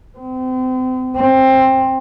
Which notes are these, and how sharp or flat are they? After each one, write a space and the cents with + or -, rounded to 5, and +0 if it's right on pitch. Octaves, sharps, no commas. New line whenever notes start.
C4 -35
C4 +15